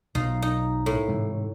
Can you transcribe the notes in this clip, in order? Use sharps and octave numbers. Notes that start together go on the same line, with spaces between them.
B1 B2 F#3 D#4 F4
D#4
A2
G#2 C3 E3